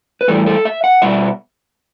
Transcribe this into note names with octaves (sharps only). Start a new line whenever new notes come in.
B4
A2 E3 G3 A4
A4
E5
F#5
B2 G3 E5